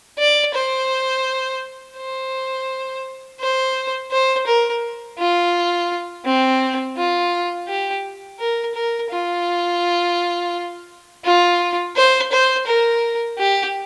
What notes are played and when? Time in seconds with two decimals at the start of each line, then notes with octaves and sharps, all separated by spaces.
0.19 D5
0.55 C5
1.97 C5
3.40 C5
4.12 C5
4.47 A#4
5.19 F4
6.25 C4
6.97 F4
7.68 G4
8.39 A#4
8.75 A#4
9.10 F4
11.25 F4
11.96 C5
12.32 C5
12.67 A#4
13.39 G4